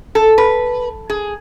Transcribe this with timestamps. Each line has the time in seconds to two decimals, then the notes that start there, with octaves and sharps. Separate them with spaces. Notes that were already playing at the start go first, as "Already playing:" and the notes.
0.15 A4
0.38 B4
1.10 G#4